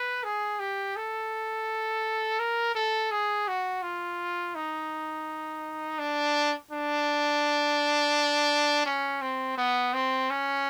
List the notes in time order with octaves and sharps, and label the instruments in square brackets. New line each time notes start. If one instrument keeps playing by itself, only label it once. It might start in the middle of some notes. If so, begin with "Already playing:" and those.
Already playing: [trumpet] B4
G#4
G4
A4
A#4
A4
G#4
F#4
F4
D#4
D4
D4
C#4
C4
B3
C4
C#4